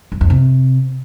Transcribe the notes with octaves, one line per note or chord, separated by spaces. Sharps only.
F#2
F2
C3